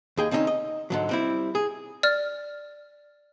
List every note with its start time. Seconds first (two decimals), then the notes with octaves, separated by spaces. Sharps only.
0.18 D#2 G#4 G5
0.31 D3 C4 C#4 D#4
0.47 D#5
0.90 G#2 D3 F#3
1.09 G3 C4 E4
1.55 G#4
2.03 D5 F6